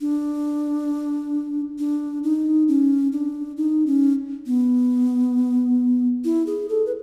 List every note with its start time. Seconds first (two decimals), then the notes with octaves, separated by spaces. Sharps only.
0.01 D4
1.79 D4
2.23 D#4
2.68 C#4
3.12 D4
3.57 D#4
3.86 C#4
4.46 B3
6.24 E4
6.46 G#4
6.69 A4
6.86 B4